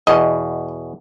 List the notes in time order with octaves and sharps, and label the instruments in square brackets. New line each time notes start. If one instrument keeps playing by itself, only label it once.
[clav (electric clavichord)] E2 B2 [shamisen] D#5